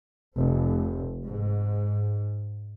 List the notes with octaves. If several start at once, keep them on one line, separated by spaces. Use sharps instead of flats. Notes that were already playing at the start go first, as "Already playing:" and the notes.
F1
G#2